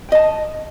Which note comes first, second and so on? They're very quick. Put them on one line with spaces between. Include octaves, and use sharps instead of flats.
G5 D#5 A5